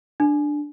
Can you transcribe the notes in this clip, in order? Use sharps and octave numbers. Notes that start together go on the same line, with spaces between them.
D4